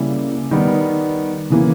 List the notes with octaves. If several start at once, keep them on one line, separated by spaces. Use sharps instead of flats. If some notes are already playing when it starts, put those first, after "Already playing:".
Already playing: C#3 G3 A#3 E4
D#3 G3 B3
C#3 E3 A#3